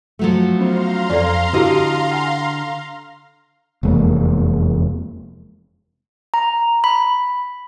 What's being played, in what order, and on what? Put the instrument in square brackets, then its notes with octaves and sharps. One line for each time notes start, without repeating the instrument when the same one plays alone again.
[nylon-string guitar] F3 F#3 A3
[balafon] B3 C#4 C5 [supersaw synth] F5 A#5 C6
[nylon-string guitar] F2 [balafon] A4 D5
[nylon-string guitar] D3 D#5 [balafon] E4 F#4 G4
[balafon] F#5 G#5
[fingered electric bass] F1 E2 G#3 A#3
[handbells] A#5
B5